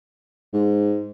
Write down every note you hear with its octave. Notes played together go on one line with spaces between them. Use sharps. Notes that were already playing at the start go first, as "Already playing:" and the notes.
G#2